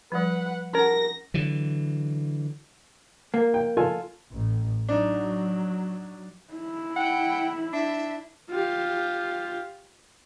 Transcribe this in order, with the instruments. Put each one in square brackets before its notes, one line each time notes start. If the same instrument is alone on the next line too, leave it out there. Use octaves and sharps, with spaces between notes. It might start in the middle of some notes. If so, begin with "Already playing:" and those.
[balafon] F3 G3 [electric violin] B4 F#5
[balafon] C#4 F#5 [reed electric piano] A#4 [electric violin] A#6
[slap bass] D3 E3 F#3
[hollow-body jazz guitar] A#3
[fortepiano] G5
F4 A4 G#5
[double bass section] A1
[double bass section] F#3 [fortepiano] D4 D#4
[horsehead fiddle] E4
[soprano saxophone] F#5 [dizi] G5
[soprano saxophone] D4 [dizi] E5
[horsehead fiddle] F4 G4